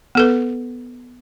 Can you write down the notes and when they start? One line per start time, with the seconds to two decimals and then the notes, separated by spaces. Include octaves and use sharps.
0.15 B3 A4 B4